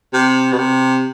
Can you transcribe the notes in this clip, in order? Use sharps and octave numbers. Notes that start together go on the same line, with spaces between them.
C3
B2
C3